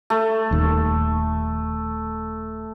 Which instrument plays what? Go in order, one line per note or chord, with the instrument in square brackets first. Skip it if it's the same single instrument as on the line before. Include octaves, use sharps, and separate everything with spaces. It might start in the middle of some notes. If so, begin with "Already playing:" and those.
[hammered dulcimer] A3
[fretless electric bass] D#1 D#2